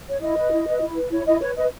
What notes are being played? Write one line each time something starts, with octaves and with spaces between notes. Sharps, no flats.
C#5
E4 D#5
B4
E4
B4
E4
B4
E4 C#5
E4 D#5
B4 C#5
B4 D#5